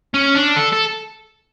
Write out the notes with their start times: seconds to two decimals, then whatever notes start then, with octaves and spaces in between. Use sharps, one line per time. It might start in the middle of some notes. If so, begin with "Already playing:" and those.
0.14 C#4
0.35 D4
0.57 A4
0.73 A4